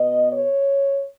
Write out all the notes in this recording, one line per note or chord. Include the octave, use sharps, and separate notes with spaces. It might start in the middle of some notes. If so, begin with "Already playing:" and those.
Already playing: B2 B3 D#5
C#5